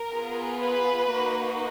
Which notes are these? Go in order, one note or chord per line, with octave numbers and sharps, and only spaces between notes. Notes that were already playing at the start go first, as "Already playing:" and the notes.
Already playing: A#4
B3 F4 G#4
B4
A#3 D#4 F#4